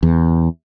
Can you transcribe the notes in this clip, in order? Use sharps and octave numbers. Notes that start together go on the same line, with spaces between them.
E2